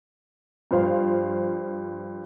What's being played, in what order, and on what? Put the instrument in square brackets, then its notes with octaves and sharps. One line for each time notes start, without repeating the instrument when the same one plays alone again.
[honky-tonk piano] G2 F3 C5 F5